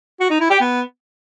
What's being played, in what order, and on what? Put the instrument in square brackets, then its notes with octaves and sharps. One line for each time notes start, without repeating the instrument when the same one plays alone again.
[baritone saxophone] F#4
D#4
E4
G4
B3